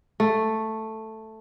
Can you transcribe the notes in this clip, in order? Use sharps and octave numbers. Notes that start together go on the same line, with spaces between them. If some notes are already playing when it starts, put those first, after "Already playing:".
A3